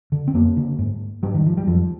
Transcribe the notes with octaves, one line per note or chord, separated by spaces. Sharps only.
D3
C4
F2 A#3
D3
G#2
G#2 G3
D#3
F3
G3
F2 F3